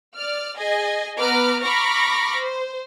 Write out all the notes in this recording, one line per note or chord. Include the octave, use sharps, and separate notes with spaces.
D5 F6
G#4 D#5 G#5
B3 B4 A#5 D6 F6
A#5 B5 C#6 D6 F6 A#6
C5